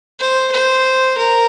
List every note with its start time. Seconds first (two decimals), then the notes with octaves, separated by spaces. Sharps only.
0.20 C5
0.52 C5
1.18 A#4